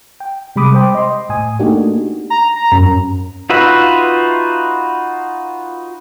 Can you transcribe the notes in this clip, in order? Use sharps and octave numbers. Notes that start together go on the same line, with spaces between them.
G5
C3 G3 G#3 B5 D6 D#6
C5 G5 D6
D#5 C6
A2 G#5 D#6
A3 A#3 D4 D#4 F#4 G4
A#5
A#5
F#2
D#4 F4 F#4 B4 E5